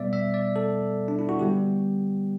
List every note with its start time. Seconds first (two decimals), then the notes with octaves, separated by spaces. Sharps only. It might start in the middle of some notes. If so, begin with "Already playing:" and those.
Already playing: B2 G3 B3 D5 E5
0.13 E5
0.34 D5
0.56 A4
1.08 D4
1.19 E4
1.29 F#4
1.39 D3 G3 B3 G4